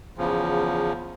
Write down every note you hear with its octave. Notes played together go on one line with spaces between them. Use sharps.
E2 C#3 F3